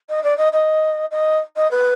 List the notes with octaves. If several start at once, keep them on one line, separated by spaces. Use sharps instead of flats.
D#5
D5
D#5
D#5
D#5
D#5
B4